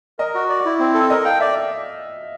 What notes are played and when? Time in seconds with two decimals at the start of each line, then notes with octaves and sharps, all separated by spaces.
0.19 A#4 D#5
0.35 F#4
0.49 D5
0.65 E4
0.79 C4
0.94 A4
1.10 A#4 D#5
1.25 F5 G5
1.40 D5 E5